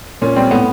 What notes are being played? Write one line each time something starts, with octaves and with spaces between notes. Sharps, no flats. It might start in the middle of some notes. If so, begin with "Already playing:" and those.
A#2 C#4
G3 C4
A2 B3